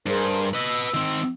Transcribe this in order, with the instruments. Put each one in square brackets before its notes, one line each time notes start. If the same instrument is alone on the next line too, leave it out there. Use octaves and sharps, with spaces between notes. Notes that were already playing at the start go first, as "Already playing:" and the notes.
[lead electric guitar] G2 [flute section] G#4 A#4 C5
[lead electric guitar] B4 D#5 [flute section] E6
[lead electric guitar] D#3 C4